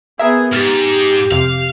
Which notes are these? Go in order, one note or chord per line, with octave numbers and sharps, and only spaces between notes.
B3 G#4 A#4 E5
G#2 G4 F6 A6 B6
F2 C3 F5